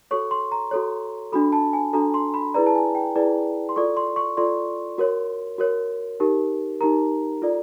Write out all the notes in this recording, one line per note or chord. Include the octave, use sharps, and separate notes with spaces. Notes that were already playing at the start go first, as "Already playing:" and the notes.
F#4 A4 C#5 C#6
C6
A#5
F#4 A4 C#5
D4 F#4 A4 B5
A5
G#5
D4 F#4 A4 A#5
C6
B5
E4 G#4 B4 D5 A#5
A5
G#5
G5
E4 G#4 B4 D5
C6
F4 A4 D5 C#6
C6
C#6
F4 A4 D5 C6
F#4 A#4 C#5
F#4 A#4 C#5
D#4 G4 A#4
D#4 G4 A#4 A#5
F4 A4 D5